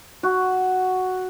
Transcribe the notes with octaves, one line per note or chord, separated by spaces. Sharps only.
F#4